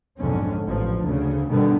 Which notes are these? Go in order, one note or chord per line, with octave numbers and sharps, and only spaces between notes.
B1 F2 G#2 D3 C#4
A1 F3
D2 C#3
G2 B2 D3 D#3 G3 B3